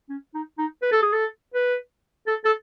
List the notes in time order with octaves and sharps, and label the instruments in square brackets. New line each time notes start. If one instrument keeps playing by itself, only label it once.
[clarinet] C#4
D#4
D#4
B4
A4
G#4
A4
B4
A4
A4